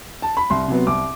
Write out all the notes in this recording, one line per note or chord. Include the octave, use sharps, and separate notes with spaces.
A5
B5
C2 C6
C3 F#3 B3
C2 D6